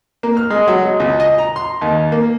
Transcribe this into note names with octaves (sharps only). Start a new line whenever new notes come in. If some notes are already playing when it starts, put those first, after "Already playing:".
A#3
F6
G#3
F#3
G#3
C#2
D#5
A#5
C6
D#2
A#3